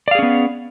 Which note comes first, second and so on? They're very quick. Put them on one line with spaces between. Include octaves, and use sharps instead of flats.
D5 F5 G#4 C#4 B3